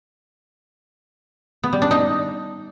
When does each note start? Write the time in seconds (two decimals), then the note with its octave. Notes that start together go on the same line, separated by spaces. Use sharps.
1.64 B3
1.73 G3
1.82 D4
1.91 D#4